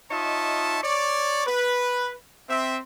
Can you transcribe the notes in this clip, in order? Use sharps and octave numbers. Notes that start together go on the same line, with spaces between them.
D#4 F4 C#5 D#5 E5 A5
C#5 D5
B4
C4 E5